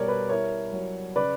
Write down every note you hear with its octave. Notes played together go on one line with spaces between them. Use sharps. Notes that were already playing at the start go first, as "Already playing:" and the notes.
Already playing: B2 G3 A#4 C#5 D5
B4
E4 A#4 C#5
F#3
C#3 B4 D5